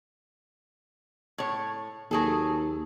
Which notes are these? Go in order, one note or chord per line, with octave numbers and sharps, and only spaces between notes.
A2 C#5
D#2 F#3 G#4 A4